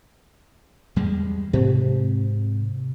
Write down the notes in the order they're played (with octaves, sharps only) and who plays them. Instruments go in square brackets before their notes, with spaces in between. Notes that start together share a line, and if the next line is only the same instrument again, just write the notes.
[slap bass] E2 G3 G#3
[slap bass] G#2 [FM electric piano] C3